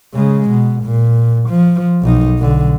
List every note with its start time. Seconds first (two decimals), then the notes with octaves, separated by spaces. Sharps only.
0.14 C#3 G#3
0.50 B2
0.84 A#2
1.49 F3
2.03 B1 D#4
2.39 B1 D3